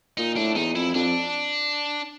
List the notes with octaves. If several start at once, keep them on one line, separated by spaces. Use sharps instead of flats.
A#2 D#4
A2 D4
E2 D#4
F2 E4
F2 D4